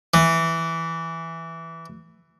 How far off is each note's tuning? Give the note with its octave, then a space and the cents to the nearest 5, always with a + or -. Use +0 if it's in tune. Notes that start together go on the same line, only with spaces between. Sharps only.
E3 +0